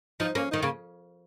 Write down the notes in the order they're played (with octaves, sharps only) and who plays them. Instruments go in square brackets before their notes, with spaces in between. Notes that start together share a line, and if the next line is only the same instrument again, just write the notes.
[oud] F3 [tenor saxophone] D#4
[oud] A#3 [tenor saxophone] C#4
[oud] D#3 [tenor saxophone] D#4
[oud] C#3 [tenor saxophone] A#3